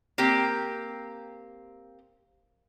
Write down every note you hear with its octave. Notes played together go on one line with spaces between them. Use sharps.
A#3 C4 G4